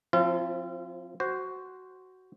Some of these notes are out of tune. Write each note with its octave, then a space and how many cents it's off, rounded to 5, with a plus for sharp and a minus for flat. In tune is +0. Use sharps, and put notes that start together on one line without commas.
F3 +25 C4 +10 F4 -40
F#4 +10 C5 +0